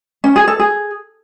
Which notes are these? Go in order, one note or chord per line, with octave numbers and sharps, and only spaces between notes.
C#4
G#4
A4
G#4